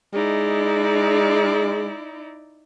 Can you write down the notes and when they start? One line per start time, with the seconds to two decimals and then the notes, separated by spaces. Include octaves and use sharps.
0.14 G#3 D#4 E4 D5